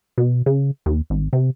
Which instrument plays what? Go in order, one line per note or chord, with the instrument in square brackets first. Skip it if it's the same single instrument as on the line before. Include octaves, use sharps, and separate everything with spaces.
[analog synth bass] B2
C#3
D#2
G#1
C3